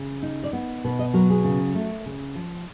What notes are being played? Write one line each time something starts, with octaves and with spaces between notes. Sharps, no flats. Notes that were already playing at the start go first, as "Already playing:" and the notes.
Already playing: C#3
D#4
D5
B3
B2 B4
D#5
F#3 A#4
G#4
C#3
A3
C#3
F3